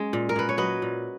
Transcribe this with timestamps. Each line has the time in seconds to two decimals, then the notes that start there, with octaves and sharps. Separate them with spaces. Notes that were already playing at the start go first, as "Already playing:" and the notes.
Already playing: G#3 C#4
0.13 A#2
0.29 A#4
0.36 A#2 B4
0.49 C#5
0.57 F#3 B4 D#5
0.82 A#2